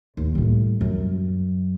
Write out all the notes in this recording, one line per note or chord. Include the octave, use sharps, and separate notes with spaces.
D#2
A2 G3
F#2